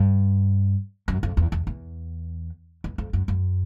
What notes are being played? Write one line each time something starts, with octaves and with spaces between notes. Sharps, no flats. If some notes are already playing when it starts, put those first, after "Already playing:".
Already playing: G2
F#2
F2
E2
E2
E2
E2
F2
F#2
F#2